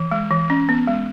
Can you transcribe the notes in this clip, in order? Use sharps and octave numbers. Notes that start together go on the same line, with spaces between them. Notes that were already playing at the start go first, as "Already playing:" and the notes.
Already playing: E3
G#3
E3
C#4
B3
G#3